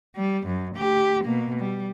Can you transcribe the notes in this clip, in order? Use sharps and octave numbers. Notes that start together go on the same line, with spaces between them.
G3
F#2
D2 G4
B2 A#3
G3